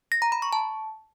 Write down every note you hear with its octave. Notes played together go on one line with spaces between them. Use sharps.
A#6
A#5
B5
C#6
A5